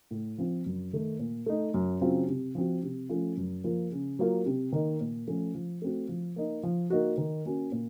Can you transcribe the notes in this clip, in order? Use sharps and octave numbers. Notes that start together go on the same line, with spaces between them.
A2
F3 C4 F4
F#2
D#3 A3
A#2
A3 D#4
F#2
C#3 F#3 C4 F4
C3
F3 C4 F#4
C3
F3 A3 C#4 F4
F#2
F3 A#3 F4
C#3
F#3 A#3 F4
C3
D#3 A#3 D#4
A#2
F3 A3 C#4
F3
A3 C4 F#4
F3
A#3 D#4
F3
A#3 D#4 F#4
D#3
A#3 C#4 F#4
A#2